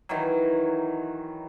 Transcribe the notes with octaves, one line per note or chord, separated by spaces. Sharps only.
D#3 E3 F#3